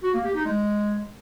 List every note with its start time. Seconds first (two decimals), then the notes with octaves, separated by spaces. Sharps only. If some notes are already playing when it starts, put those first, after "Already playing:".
0.03 F#4
0.14 A#3
0.24 G4
0.35 D#4
0.46 G#3